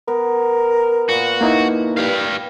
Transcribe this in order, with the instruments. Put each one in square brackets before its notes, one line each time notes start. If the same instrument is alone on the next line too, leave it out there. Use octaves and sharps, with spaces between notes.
[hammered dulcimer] B3 [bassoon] A#4
[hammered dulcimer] A#2 B3 [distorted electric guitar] F#4
[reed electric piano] A#3 D#4 E4
[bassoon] G2 [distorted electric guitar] G4 F5